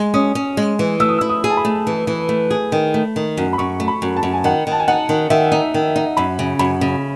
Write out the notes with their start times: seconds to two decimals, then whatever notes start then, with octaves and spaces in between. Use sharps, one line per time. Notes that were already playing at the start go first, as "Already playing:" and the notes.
Already playing: G#3
0.14 C#4 D#6
0.35 C#4
0.57 G#3
0.79 E3
1.00 A3 E6
1.09 D#6
1.18 E4 E6
1.29 D#6
1.44 G#4
1.50 A5
1.57 B5
1.65 A3
1.87 E3
2.07 E3
2.29 A3
2.51 G#4
2.72 D#3
2.94 A3
3.16 D#3
3.37 F#2
3.53 B5
3.58 F#2 C#6
3.80 A3
3.88 B5
4.02 F#2
4.17 A5
4.23 F#2
4.34 G#5
4.44 D#3 F#5
4.67 D#3 A5
4.80 G#5
4.88 D#4 F#5
5.09 D#3
5.30 D#3 E5
5.52 D#4
5.74 D#3
5.96 D#4
6.17 F#2 B5
6.39 C#3
6.59 F#2 B5
6.81 C#3